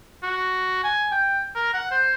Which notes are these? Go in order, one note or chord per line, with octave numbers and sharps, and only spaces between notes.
F#4
G#5
G5
A#4
F#5
C5